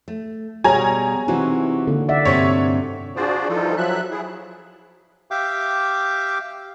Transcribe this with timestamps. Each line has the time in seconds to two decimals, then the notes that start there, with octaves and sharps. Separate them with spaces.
0.08 A3
0.64 B2 G3 F#4 G#4 C#5 G#5 A#5
1.28 C3 E3 D#4 F#4
1.87 D3 A#3
2.09 D5 E5 F#5
2.25 G2 C3 C#5
3.16 D4 F4 F#4 G#4 C5 D5
3.49 E3 F3 G3 D#4 F4 A4
3.77 F3 F#3 E5 F#6
4.11 E4 G#4
5.31 G4 E5 F5 G5 D6